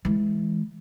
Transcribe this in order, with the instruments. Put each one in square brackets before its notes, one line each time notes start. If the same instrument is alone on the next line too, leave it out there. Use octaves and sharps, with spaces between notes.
[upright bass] E3 G#3